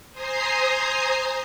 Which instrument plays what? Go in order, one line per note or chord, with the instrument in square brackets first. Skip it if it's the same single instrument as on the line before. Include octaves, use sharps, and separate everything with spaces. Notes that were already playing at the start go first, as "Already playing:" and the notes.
[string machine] C5 G#5 A#5 D#6 C7